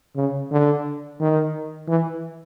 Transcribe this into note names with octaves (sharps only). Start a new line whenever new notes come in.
C#3
D3
D#3
E3